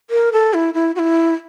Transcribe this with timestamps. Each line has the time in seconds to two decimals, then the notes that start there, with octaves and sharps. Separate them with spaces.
0.10 A#4
0.33 A4
0.54 E4
0.74 E4
0.96 F#4
0.99 E4